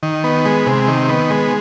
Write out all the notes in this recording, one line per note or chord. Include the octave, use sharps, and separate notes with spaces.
D#3
B3
G#3
C3
D#3
B3
G#3